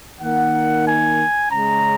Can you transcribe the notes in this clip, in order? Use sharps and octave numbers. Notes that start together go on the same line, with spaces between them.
D#3 A#3 D#4 F#5
G#5
C#3 G#3 C#4 A#5